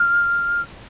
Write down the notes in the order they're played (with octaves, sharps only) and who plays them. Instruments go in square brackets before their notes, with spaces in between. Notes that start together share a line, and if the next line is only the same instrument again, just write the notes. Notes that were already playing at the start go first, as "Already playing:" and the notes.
Already playing: [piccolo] F6